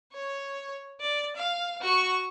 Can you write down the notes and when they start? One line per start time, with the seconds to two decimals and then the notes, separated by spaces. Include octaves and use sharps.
0.13 C#5
1.01 D5
1.36 F5
1.81 F#4 C#6